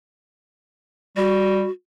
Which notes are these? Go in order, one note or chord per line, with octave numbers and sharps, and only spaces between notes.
G3 F#4